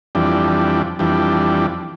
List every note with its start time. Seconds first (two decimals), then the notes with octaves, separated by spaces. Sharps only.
0.15 F2 E3 G3 D4
0.99 F2 E3 G3 D4